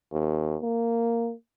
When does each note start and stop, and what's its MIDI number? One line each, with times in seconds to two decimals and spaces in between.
0.13 0.56 39
0.62 1.33 58